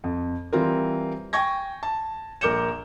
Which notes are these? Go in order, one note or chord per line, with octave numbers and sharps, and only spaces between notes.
F2
E3 G3 C4 F4 A#4
G5 G#5 C#6 G#6 A#6
A5
A#1 A#4 D6 G6 C#7 E7